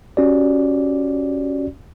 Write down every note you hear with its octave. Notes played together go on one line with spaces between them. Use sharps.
C#4 F#4 G4 D5